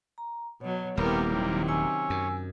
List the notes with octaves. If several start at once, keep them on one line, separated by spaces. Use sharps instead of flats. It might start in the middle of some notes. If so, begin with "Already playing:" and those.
A#5
B2 F#3 C#5
D#1 C3 G3 A#3 B3 E4 A#4 G5
C3 D#3 F#3
C#4 G#5 E6
F#2